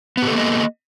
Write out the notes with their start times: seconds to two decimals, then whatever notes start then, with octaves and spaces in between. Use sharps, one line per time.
0.17 B3
0.22 G4
0.27 A4
0.32 A#3
0.37 D#5